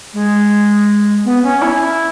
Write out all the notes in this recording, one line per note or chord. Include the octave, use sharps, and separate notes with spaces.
G#3
B3
C#4
E4